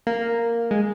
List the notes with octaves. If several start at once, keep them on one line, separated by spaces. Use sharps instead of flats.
A#3
G#3